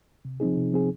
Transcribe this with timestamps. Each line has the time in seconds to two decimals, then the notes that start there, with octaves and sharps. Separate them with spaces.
0.25 C3
0.40 F3 C4 D#4 G#4
0.57 C3
0.72 F3 C4 D#4 G#4